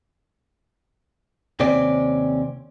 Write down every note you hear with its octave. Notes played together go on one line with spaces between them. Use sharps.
D#2 C3 C4 C#4 D5